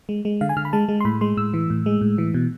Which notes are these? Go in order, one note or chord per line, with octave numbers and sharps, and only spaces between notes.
G#3
G#3
D3 F5
G#5
D3 F6
B5
G#3 A5
G#3
C6
A2 B5
G#3 C6
A2 E6
E3
A2
G#3
A2
E3
B2